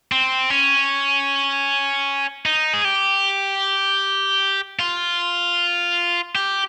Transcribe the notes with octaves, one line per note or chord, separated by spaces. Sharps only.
C4
C#4
D#4
G#4
G4
F4
G4